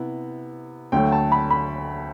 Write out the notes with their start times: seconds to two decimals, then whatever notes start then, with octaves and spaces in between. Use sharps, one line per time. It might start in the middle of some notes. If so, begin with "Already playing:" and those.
Already playing: C3 B3 E4
0.92 D2 D3 F#3 A3 G5
1.12 A5
1.32 B5
1.51 B5